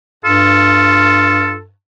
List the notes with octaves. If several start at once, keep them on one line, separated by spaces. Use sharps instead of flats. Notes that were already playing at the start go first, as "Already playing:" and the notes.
G2 F4 A4